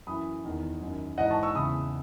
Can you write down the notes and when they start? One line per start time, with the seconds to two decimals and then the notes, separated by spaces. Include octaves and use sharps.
0.07 F#2 E3 B5 D#6
0.44 E2 D#3
0.81 F#2 D#3
1.18 G#2 E3 D#5 F#5
1.30 A5 C#6
1.43 C#6 E6
1.55 E2 C#3 E3 B5 D#6